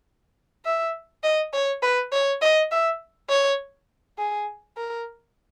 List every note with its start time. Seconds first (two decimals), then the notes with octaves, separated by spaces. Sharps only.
0.65 E5
1.23 D#5
1.53 C#5
1.82 B4
2.12 C#5
2.42 D#5
2.71 E5
3.30 C#5
4.18 G#4
4.77 A#4